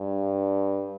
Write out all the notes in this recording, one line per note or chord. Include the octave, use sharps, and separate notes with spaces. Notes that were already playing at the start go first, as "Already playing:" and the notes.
Already playing: G2